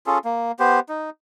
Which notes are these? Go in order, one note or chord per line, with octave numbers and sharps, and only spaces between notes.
C#4 F4 G#4 A4
A#3
B3 G4 C5
D#4